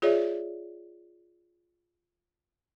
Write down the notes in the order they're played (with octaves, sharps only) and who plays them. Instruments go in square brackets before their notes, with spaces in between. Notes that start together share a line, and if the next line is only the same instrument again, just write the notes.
[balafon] F4 G#4 C#5 D5 E5